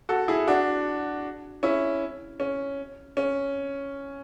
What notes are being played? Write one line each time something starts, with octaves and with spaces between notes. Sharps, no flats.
F#4 A4
E4 G#4
D4 F#4
C#4 E4
C#4
C#4